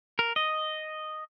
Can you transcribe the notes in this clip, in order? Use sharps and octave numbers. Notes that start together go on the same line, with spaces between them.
A#4
D#5